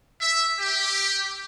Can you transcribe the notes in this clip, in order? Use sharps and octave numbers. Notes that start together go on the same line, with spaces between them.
E5
G4